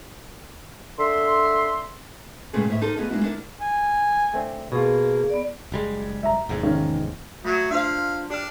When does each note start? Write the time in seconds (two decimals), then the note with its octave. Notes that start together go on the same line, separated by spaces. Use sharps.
0.99 D3 E5 C6
2.53 G2 A#2 C#3 G#3 A3
2.68 D2 A2 E5
2.81 D#4 G4 A4 A#4 C5
2.97 A3 B3 E4 F4 G#4 D#5
3.10 G#3 A#3 D4 E4 F#4
3.24 D4 E4 A4 A#4
3.61 G#5
4.34 A3 C4 D4
4.72 B2 A#3 F4 G#4
5.30 B3 D5
5.72 F#1 G3 G#3
6.23 E5 A#5
6.49 F1 E2 G#2
6.63 D#3 A#3 C#4
7.45 F#3 A3
7.71 D4 F4 C5 F5
8.30 D4 G4 F6